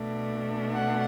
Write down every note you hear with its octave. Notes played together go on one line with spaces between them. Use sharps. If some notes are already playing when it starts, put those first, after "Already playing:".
Already playing: B2 A3 D4
F#5